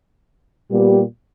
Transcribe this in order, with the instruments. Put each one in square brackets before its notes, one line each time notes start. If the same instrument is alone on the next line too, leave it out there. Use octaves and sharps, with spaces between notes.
[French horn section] A#2 G3 B3 G4